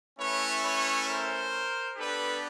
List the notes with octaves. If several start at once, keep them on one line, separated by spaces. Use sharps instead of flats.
A3 C#4 E4 B4 C#5
B4 C#5
A#4 C5
B3 D4 G4 A4 B4